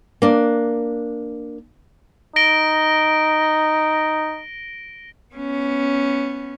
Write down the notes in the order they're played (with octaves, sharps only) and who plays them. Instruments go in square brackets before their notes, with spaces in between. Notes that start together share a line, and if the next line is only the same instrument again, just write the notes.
[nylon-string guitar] A#3 D4
[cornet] D#4 [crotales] A#6 D7 G7
[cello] B3 C#4